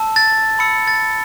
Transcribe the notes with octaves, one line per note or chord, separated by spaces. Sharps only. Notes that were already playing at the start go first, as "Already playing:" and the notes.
Already playing: A5 E6
A6
B5 E6 C#7
A6